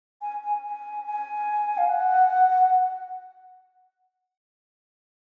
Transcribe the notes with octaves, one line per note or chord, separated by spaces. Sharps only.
G#5
G#5
G#5
G#5
F5
F#5